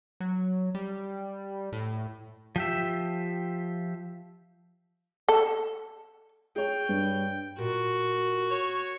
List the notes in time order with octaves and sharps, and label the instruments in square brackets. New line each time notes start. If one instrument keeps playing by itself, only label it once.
[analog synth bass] F#3
G3
A2
[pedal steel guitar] F3 G4 E5
[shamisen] A4
[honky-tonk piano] G#4 C#5 [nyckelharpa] G5
[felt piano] G2
[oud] A#2 [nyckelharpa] F#4
[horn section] C#5